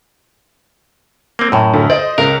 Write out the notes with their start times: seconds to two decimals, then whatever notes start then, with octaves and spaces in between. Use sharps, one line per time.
1.39 A#3 C4
1.52 F#2 A2
1.74 D2
1.90 C5 D5 D#5
2.18 C#2 A#4